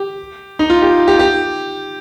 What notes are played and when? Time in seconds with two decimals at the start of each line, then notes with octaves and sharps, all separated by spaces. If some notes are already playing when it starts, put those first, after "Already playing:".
Already playing: G4
0.59 D#4
0.70 F4
0.82 G4
1.08 G4
1.19 G4